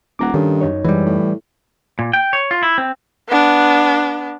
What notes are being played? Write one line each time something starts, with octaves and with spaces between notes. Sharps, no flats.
D#1 F#5 A#5 D6
G2 D#3 C#4 D#4 A4
F#2 D#4 C#5
G#2 E3 G3
A2
A#2
G5
C#5
F4
E4
C4
B3 D4